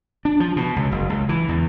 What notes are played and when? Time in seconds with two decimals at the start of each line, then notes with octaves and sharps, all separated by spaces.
0.25 D4
0.40 F3
0.56 B2
0.76 C#2
0.92 F#1
1.10 C#2
1.29 E3
1.49 E2